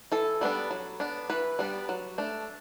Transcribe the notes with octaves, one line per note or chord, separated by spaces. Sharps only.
E3 A4
G3 B3 D4
F#3
B3 D4
E3 B4
G3 B3 D4
F#3
A3 D4